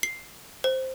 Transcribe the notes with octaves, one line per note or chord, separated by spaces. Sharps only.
C7
C5